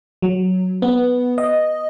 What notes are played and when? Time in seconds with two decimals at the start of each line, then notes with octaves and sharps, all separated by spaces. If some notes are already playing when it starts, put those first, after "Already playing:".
0.22 F#3
0.82 B3
1.38 D#5